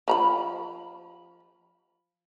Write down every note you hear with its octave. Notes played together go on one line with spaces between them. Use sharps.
F3 A#5 B5